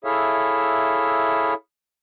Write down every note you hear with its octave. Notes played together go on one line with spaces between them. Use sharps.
E4 G#4 A4 C#5 E5 F5